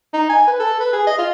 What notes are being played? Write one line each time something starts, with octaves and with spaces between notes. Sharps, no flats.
D#4
G#5
B4
A4
B4
G#4
D#5
F4